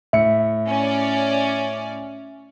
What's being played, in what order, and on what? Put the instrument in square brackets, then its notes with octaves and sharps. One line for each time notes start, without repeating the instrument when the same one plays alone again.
[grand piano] A2 C#7 [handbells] E5
[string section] C#4 D5